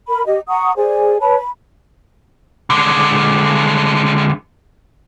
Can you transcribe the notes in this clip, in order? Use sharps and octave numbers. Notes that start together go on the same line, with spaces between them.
A#4 B5
G4 D#5
F#5 A#5 C#6 D#6
G#4 C5 D5 G#5
B4 C#5 A5 B5
B5
D3 G#3